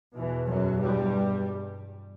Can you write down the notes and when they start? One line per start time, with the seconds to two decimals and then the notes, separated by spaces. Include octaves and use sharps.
0.15 E2 B2 E3
0.47 F#2 F#3
0.79 G2 G3